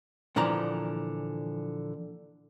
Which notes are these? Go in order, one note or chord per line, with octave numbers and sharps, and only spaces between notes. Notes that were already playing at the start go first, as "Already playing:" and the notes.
A#2 D3 E3 F3 A#5